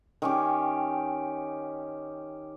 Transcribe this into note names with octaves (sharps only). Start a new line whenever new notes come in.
D#3 C#4 G4